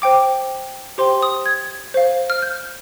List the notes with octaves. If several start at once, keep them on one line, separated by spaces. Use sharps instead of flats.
C5 G5 D6
G4 C5 G5 C6
D#6
G#6
C5 F5
F6
G6